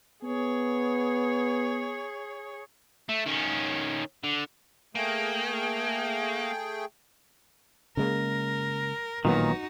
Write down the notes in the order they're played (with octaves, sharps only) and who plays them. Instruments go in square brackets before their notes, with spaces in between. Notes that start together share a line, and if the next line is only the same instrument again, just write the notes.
[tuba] B3 [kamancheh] G#4 C#5
[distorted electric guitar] A3
D#3 C#4
D3
[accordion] A3 G#4 G5 [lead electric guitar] A#3
[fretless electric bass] C#3 G#3 A#3 [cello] A#4
[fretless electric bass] A1 F#3 B3 [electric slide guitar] A#2 D#3 [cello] D#4 F#4